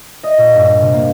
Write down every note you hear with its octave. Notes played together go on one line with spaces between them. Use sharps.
D#5
A#2
G2
C3
A#3